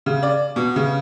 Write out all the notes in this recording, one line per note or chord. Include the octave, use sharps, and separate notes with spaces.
C#3
D5
B2
C#3